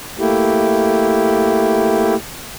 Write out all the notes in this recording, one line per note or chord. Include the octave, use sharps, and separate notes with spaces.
A3 A#3 E4 G4